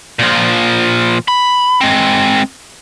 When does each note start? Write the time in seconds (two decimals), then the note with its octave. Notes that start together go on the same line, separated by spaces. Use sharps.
0.19 A#2 F3
1.28 B5
1.81 G#3 C4